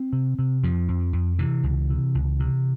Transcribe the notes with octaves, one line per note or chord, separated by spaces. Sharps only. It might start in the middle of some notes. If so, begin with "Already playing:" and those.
Already playing: C4
C3
C3
F2 F3
F2
F2
C3 E3
C#2
C3
C#2
C3